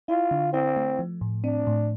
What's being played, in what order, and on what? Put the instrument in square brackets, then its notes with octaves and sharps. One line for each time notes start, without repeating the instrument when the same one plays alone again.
[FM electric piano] E4 [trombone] F4
[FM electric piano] D3
[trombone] C4 [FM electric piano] E4
[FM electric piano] A3
F3
A2
[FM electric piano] C4 [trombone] D4
[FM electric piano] A2